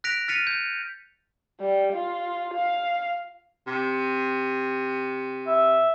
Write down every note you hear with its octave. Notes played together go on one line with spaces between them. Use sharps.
F#6 A#6 B6 D7 F7
F6 A6 B6 C#7 D#7 F7
G6
G3
F4
F5
C3
E5